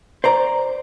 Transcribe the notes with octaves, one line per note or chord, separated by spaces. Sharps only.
C5 D5 A#5